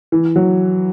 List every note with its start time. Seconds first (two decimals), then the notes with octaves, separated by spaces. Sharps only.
0.12 E3
0.36 F#3